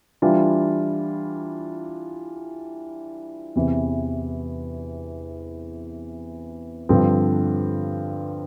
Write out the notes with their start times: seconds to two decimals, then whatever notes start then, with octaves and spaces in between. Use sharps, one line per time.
0.22 E3 G3 D4 F4
3.56 E2 C3 E3
6.89 G2 D3 F3 C4